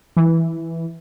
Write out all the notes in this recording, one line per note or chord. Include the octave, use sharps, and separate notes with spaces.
E3